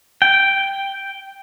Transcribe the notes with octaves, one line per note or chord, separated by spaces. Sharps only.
G5